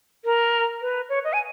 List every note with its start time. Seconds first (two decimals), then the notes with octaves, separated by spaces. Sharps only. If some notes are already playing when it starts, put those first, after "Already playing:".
0.25 A#4
0.82 B4
1.09 C#5
1.24 D#5
1.33 G#5